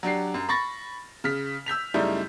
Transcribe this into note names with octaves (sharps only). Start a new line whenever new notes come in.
F#3 D4 G4 C7
F#2
B5 C#6 A6 A#6
C#3 F6 B6
E6 G6 B6 F7
F#2 C#3 G3 A3 D#4 E4